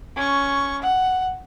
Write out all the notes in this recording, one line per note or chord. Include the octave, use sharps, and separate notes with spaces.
C#4 C#6
F#5